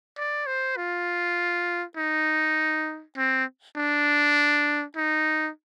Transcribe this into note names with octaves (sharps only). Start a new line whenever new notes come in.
D5
C5
F4
D#4
C4
D4
D#4